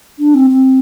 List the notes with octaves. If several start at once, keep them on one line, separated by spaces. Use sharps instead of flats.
D4
C4
C4